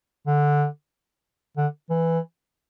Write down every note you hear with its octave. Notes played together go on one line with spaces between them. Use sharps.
D3
D3
E3